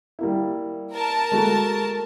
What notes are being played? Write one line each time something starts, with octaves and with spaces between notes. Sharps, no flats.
G3 A#3 E4
A#4 A5
G#3 A3 F#4